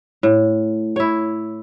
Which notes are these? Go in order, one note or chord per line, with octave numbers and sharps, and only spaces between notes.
A2
E4 C#5